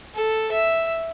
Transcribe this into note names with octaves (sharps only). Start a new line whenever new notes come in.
A4
E5